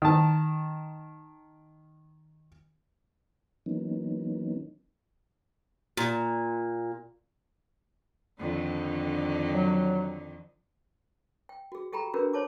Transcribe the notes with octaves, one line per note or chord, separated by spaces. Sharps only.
D#3 A5
E3 F#3 A#3 B3 C#4 D#4
A#2
F2 D3 D#3
F#3
G5
F#4 G#4
G4 A4 G5 A#5 B5
C#4 D4 F#4 G#4 A#4 B4
C5 C#5 A5 D6